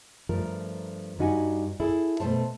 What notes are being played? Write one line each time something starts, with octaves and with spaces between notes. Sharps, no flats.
G2 F3 A3 A#4
G2 G3 D#4 F#4 G#5
E4 G#4 A4
B2 D#3 A3 C5 A5